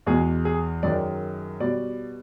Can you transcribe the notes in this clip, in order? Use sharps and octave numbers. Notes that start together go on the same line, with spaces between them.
E2 B2 G#3 G#4
G#4
F#2 D#3 G#3 D5
B2 G3 D5